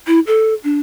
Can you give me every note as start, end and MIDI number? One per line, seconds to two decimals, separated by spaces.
0.07 0.20 64
0.27 0.54 69
0.64 0.81 62